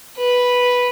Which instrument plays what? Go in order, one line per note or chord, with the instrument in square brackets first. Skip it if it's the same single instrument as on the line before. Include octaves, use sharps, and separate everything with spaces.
[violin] B4